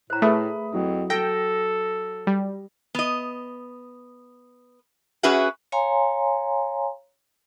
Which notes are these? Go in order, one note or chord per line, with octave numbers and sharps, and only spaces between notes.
A2 C5 A#5
A3 G#4 B4 E5 B5 D#6
F2 F#3 E4
F#3 A4 G5 A#6
G3
B3 D#5
C#4 F#4 G#4 B4 E5 F#5
C#5 F5 G#5 A#5 C6